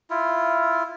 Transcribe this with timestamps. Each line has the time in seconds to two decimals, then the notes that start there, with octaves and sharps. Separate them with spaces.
0.10 E4 F4